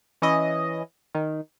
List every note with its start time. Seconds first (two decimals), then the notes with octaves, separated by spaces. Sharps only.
0.22 E3 C#4 E4 D#5
1.15 D#3